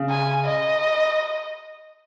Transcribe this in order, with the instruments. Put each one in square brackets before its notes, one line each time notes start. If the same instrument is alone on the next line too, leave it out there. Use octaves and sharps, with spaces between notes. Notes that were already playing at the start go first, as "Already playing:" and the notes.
Already playing: [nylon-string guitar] C#3
[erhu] G#5
D#5